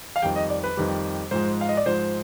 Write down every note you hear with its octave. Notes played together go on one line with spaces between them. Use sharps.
F5
F2 D#3 G3 G5
D#5
D5
B4
F2 D#3 G3
G#2 F3 G#3 C5
F5
D#5
D5
G#2 F3 G#3 C5